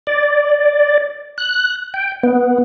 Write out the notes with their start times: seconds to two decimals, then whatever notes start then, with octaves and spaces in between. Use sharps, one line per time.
0.07 D5
1.38 F#6
1.94 G5
2.23 B3